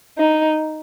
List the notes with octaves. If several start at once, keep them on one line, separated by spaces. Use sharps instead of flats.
D#4